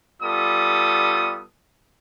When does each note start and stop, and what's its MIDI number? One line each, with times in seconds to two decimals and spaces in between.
0.21 1.42 55
0.21 1.42 59
0.21 1.42 65
0.21 1.42 69
0.21 1.42 87